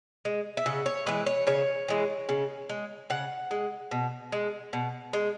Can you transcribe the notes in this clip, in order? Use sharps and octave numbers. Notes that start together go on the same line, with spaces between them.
G#3
E5
C#3 F#5
C#5
E3 G#3 B4
C#5
C#3 C#5
E3 G#3
C#3
G#3
C#3 F#5
G#3
B2
G#3
B2
G#3